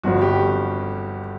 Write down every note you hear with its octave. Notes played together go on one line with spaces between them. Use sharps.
G1 G2 D3 F3 F#4
G4